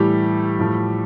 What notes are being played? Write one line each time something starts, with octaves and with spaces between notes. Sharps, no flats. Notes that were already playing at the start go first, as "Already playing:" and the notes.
Already playing: A2 E3 G3 A3 G4
A2 F3 A3